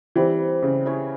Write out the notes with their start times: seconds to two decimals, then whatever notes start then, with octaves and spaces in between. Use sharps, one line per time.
0.16 E3 G3 C4 G4
0.63 C#3
0.86 E4 G#4 C#5